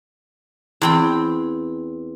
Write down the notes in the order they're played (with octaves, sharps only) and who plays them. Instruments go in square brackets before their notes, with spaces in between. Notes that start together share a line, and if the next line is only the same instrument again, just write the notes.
[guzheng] E2 C4 G5